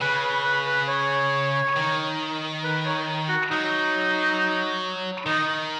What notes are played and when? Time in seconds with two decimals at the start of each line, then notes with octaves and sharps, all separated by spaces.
0.01 C#3 B4
0.23 B4
0.45 B4
0.67 B4
0.88 C#5
1.77 D#3
2.64 B4
2.86 C#5
3.29 F#4
3.51 F#3 D#4
5.26 D#3 D#4